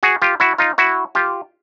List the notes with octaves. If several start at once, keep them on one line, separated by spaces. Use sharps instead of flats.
F#4 G#4
F4 G4
E4 F#4
D#4 F4
E4 F#4
F4 G4